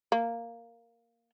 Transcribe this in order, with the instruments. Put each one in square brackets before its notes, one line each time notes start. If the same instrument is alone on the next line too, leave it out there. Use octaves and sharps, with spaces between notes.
[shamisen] A#3